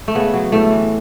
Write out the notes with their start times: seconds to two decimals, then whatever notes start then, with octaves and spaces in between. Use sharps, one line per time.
0.08 A3
0.15 C#3 B3
0.34 F#3
0.52 A2 A3
0.71 E3